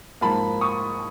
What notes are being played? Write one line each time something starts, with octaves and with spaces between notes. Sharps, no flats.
G#2 F3 A#3 A5 B5
C#6 D#6